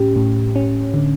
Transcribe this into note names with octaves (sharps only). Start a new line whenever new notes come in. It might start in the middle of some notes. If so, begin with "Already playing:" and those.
Already playing: A2 C#4 G4
A2
C#4
D3